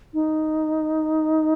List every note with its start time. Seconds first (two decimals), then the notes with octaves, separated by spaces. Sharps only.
0.14 D#4